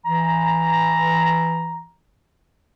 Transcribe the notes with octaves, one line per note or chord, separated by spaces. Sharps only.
E3 A#5